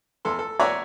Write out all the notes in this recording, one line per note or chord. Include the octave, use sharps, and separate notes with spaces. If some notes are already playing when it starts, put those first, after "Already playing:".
E2 A4 C6
A4
C#5 D5 E5 F#5 G#5 A#5